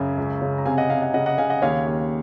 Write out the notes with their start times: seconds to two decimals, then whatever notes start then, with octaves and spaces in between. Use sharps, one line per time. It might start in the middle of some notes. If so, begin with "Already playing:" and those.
Already playing: F#2 C#3 G#5
0.17 C#2
0.42 C#3
0.58 A#5
0.66 C3 F5 G#5
0.78 D#5 F#5
0.90 C3 F5 G#5
1.02 D#5 F#5
1.14 C#3 D#5 F#5
1.26 D#5 F#5
1.38 C#3 F5 G#5
1.50 D#5 F#5
1.62 D#2 C#5 F5
1.87 D#2